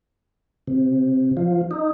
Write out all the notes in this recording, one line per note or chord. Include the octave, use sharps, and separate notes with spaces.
C3
F3
D#4